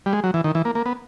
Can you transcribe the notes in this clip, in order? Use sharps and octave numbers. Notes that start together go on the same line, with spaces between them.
G3
G#3
F#3
E3
D#3
E3
A#3
A#3
B3